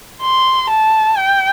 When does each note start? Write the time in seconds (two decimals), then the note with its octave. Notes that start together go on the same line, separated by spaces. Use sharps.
0.22 C6
0.70 A5
1.18 G5